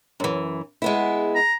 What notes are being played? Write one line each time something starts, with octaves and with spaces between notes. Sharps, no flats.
F#2 E3
G#3 B3 E4
A#5